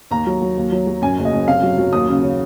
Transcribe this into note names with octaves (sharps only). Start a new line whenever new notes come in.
D#2 A#5
F#3
F#3
D#2
F#3
F#3
F#2 G#5
F#1
D#5
F#2
C3 F5
F#3
F#3
D#2 D#6
C#3
C#3